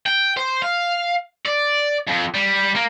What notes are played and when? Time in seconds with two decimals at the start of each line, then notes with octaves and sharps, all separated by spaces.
0.06 G5
0.37 C5
0.62 F5
1.46 D5
2.07 F2
2.34 G3
2.75 A#3